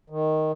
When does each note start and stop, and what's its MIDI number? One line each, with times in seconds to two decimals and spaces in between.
0.10 0.52 51